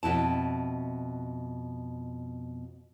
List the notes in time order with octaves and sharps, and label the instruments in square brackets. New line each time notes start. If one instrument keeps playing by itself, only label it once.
[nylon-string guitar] F2 B2 E4 A5